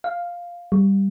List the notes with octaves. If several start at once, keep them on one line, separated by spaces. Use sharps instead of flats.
F5
G3